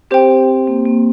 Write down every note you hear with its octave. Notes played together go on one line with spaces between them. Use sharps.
C4 G4 C5 G5
A#3
A#3